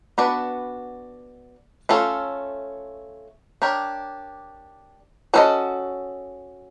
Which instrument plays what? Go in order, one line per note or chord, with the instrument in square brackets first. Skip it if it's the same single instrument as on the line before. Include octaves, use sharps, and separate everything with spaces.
[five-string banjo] B3 D4 F#4 B4 D5
A3 C#4 F4 A4
D4 G4 A#4 C#5
C#4 F#4 A4 C5 D#5